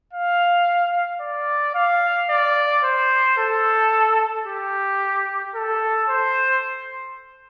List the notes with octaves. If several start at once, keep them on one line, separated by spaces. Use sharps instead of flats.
F5
D5
F5
D5
C5
A4
G4
A4
C5